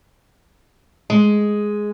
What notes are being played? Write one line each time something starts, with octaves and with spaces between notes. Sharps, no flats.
G#3